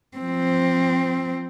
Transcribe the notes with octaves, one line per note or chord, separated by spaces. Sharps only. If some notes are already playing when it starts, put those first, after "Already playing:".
F3 C4